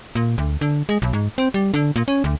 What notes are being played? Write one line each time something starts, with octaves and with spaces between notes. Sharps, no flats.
A#2
D2
D3
G#3
B1
G#2
C4
G3
D3
A#2
C#4
D2